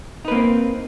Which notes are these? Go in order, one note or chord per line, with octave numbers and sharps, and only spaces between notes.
A#3 C4 D#4 B4